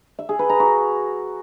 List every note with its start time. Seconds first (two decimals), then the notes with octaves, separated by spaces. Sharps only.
0.19 E5
0.29 G#4
0.39 B4
0.49 A#5
0.60 F#4